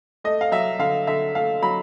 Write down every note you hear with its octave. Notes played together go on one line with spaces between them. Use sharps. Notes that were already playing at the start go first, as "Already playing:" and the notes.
A3 D#5
F5
F#3 E5
D3 F5
D3 E5
A3 F5
F#3 B5